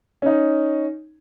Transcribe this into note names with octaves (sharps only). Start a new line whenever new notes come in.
C#4 D#4